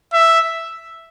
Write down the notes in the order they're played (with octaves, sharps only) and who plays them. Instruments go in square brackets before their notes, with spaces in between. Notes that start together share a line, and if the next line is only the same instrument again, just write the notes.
[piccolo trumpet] E5